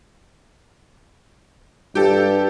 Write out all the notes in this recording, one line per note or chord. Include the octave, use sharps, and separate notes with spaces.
G2 G4 A4